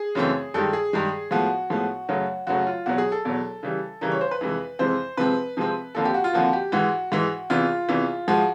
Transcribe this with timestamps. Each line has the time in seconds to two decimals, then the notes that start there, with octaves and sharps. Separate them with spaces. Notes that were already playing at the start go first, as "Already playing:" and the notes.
Already playing: G#4
0.15 F#2 C#3 E3 A3 C4
0.54 G2 D#3 G#3 A4
0.73 G#4
0.93 G2 D#3 G#3
1.31 A2 F3 G#3 B3 F#4
1.70 A2 F3 G#3 B3
2.09 F#2 C#3 F#3 A3
2.47 F#2 C#3 F#3 A3 F#4
2.67 F4
2.86 E2 B2 F#3 F#4
2.98 G#4
3.12 A4
3.25 E2 B2 F#3
3.63 C#3 E3 G3
4.01 C#3 E3 G3 A#4
4.11 C#5
4.21 C5
4.31 B4
4.41 F2 C3 E3 G#3
4.79 F2 C3 E3 G#3 C5
5.17 C3 F3 G#3 C4 B4
5.57 C3 F3 G#3 C4
5.95 F2 D3 F3 A#3 A4
6.05 G4
6.14 F#4
6.24 F4
6.33 F2 D3 F3 A#3 F#4
6.53 G4
6.72 G#2 E3 G#3 F#4
7.12 G#2 E3 G#3
7.50 E2 C3 E3 F4
7.89 E2 C3 E3
8.28 G#2 F3 G#3 F#4